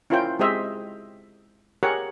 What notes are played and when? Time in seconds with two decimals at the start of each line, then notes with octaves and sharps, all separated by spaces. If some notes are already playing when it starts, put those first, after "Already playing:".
0.10 C#4 E4 F4 A#4 C5 G5
0.39 G#3 C4 G4 C5 D#5 E5
1.83 G4 G#4 A#4 C#5 F#5